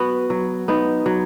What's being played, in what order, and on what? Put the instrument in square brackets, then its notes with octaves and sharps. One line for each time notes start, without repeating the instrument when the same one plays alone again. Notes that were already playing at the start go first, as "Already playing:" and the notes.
Already playing: [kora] F#3 B3 F#4
F#3
B3 D#4
F#3